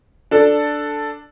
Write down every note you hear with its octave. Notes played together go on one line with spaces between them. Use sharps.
D4 A4